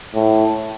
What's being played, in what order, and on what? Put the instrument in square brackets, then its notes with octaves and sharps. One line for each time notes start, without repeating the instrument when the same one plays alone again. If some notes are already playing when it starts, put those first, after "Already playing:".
[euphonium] A2